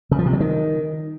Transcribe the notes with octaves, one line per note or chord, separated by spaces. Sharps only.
C#3
F3
C3
F#3
D#3